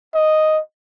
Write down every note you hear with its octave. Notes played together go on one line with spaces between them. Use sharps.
D#5